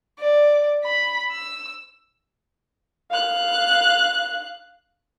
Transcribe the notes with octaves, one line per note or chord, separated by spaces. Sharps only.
D5
B5
E6
F5 F#6